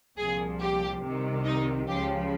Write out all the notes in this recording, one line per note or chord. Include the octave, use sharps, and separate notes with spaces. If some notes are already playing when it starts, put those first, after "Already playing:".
C2 A#2 F3 G#4
G4
C2 C3 D#3
D#4
C#2 C#3 F3 G4